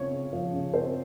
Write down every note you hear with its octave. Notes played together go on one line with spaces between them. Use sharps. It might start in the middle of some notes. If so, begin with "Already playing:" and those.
Already playing: C#3 F3 C4 C#5
C#3
F3
C#3
C4 C5